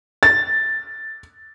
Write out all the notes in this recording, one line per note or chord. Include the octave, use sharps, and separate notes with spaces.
A6